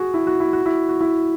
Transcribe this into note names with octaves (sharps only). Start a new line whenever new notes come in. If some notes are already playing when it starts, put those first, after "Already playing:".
Already playing: F#4 G#4
E4
F#4
E4
F#4
E4
F#4
E4